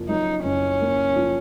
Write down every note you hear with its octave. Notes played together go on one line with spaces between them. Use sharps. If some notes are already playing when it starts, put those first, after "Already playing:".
Already playing: F#1 F3 A#3
F#2 D#4
F#1 C#4
A#3
F3